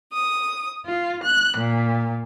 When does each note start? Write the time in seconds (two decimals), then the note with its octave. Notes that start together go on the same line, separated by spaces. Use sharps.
0.13 D#6
0.85 F4
1.24 F#6
1.57 A#2